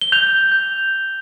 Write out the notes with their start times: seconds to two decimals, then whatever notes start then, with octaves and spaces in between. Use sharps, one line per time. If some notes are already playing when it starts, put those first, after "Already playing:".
0.01 G7
0.12 G6 F7
0.52 G6